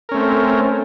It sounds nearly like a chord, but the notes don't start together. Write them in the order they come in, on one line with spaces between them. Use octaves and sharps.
A#4 C#4 A3 C4